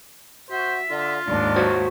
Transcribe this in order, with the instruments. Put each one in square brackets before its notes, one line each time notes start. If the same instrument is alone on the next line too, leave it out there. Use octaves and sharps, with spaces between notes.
[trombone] F#4 [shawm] C5 [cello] E5
[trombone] D3 [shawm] F4
[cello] D#2 G#2 [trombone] D4
[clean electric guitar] F#4 C5 C#5